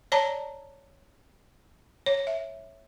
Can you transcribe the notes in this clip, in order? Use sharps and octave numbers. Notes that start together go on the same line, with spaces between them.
C#5 D5 A5 A#5
C#5
E5